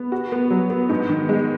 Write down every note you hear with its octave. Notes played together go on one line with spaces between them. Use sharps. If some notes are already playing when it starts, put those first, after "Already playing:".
Already playing: B3
F#4
B3
F#3
B3
G#2
D#3
G#3